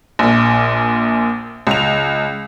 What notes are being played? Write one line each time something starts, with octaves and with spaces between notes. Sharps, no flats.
A#1 A#2
C#2 F7